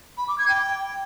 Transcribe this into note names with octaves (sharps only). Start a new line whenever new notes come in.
B5
D6
G#6
G5